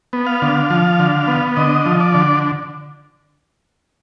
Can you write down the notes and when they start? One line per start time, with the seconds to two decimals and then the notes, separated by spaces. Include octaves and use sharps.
0.13 B3
0.27 F5
0.42 D3
0.70 F3
0.99 D3
1.28 B3
1.57 D3 D#5
1.86 F3
2.00 D5
2.14 D3